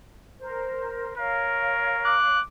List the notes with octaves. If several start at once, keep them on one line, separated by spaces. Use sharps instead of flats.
A#4 C5
A#4 C#5 F5
D6 F#6